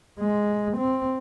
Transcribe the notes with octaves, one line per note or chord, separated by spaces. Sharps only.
G#3
C4